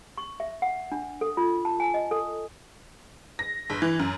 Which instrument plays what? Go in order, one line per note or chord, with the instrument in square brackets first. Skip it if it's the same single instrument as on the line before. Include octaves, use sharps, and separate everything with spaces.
[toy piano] C#6
E5
F#5
D4
A4
F4
A5
G#5
D#5
A4
[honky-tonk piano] A#6
G1
E3
F#2